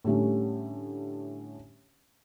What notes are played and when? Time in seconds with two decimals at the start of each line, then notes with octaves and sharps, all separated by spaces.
0.05 A2 D3 G3 A3 C#4